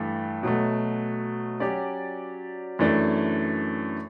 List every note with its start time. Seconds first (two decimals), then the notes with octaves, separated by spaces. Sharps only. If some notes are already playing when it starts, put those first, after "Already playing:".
Already playing: G2 E3 A3
0.43 B2 F#3 A3
1.60 F#3 C#4 G4 D5
2.79 F#2 E3 A3 D4